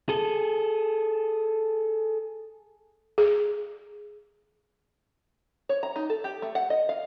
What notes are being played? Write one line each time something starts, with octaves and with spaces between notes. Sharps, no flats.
G#4 A4
G#4
C#5
A#5
D#4
A4
G4
A3
F#5
D#5
F5